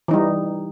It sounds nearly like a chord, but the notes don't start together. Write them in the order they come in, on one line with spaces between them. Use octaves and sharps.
E3 D#4 G3